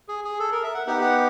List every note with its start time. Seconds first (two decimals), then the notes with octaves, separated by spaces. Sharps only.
0.09 G#4
0.24 G#4
0.40 A4
0.52 A#4
0.63 E5
0.74 F#5
0.87 B3 D#4 G4 F#5
1.01 F#5